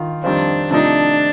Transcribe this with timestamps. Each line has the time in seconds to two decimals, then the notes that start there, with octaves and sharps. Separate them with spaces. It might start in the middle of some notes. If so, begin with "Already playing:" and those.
Already playing: D#3 F4
0.23 F2 D#3 G3 C4 D4 F4
0.71 C3 F3 A3 D4 D#4